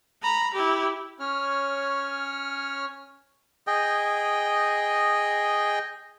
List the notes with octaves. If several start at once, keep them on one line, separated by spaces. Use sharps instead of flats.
A#5 B5
E4 G4
C#4 C#5 F6
G#4 D#5 G5